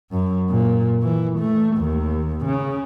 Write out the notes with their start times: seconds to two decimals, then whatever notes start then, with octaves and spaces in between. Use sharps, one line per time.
0.11 F#2
0.50 A#2
1.02 E3
1.39 A3
1.77 D#2
2.45 C#3